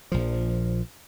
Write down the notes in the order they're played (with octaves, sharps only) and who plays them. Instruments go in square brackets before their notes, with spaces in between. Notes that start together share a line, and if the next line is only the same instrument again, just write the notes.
[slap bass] A#1 F3